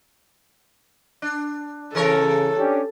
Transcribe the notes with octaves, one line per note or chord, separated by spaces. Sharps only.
D4
C#3 E3 A4 A#4 C#5
C#4 D4 G4